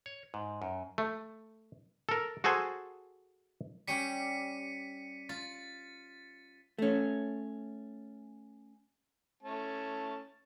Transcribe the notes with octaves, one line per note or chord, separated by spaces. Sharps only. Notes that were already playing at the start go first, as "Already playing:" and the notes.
C#5
G#2
F#2
A3
A4 A#4
F#4 G#4 A4 C5 G#5
G3 C#4 G4 B6 C#7 D#7
F4 A6
A3 C#4
A3 C#4 A5